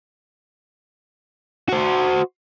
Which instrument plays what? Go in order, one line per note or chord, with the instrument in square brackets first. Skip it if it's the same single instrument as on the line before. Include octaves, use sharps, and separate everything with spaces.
[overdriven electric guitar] F#4 C5